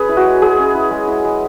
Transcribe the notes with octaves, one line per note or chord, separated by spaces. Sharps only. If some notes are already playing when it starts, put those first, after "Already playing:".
Already playing: C#4 G#4 B4 C#5
E4
F#4
G#3
G#3 G#4
C#4
E4
G#3
E4
G#3